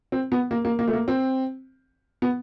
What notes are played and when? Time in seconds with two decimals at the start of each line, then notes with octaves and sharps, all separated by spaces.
0.12 C4
0.32 B3
0.51 A#3
0.65 A#3
0.79 A#3
0.88 A3
0.93 A#3
1.08 C4
2.22 B3